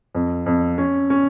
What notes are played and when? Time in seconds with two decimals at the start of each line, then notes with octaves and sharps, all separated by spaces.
0.15 F2
0.46 F2
0.78 C#4
1.10 C#4